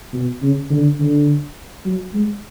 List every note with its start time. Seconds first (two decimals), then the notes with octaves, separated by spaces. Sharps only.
0.13 B2
0.42 C#3
0.70 D3
0.99 D3
1.85 F#3
2.13 G#3